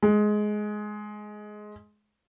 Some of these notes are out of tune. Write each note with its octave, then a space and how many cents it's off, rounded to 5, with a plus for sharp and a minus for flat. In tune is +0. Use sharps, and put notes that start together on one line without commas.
G#3 +15